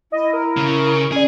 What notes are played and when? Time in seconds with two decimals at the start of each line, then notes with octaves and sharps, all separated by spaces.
0.12 E4 D#5
0.33 A#4
0.57 C#3
1.12 C#4 G#4 D5